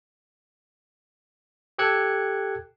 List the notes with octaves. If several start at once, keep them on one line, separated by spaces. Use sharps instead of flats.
G4 A4 G5 F#6 G#6 C#7